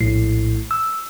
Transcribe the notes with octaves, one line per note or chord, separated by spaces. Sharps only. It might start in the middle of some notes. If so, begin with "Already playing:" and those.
A#1 A2 C7
E6